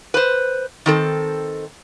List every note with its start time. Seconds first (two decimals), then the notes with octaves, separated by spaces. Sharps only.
0.14 B4 C5
0.86 D#3 C4 A4